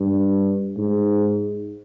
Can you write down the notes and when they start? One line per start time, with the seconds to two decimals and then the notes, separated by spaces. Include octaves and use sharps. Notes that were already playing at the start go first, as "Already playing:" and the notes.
Already playing: G2
0.77 G#2